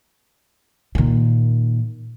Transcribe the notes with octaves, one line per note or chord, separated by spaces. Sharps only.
A#2 D#3